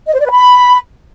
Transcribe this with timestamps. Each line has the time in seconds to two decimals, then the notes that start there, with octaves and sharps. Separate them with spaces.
0.07 D#5
0.13 C5
0.19 D5
0.26 B4
0.32 B5